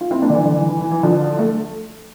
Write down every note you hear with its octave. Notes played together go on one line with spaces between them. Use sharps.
F4
C4 E4
A#3 D4
D3
E3
D3
E3
E3
E3
E3
D3 F3
A3